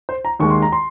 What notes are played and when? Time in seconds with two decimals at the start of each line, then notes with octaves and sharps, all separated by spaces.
0.09 C5
0.25 A#5
0.39 D#2 D#3 G#3 C#6
0.50 C6
0.62 A#5
0.73 C6